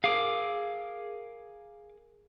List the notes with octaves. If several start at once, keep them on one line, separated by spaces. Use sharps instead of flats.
G#4 A#4 F5 D6